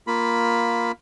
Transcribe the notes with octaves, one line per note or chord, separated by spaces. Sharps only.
A#3 F4 B5